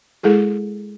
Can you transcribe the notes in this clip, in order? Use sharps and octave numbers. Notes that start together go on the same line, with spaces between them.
G#3 E4 G#4 A4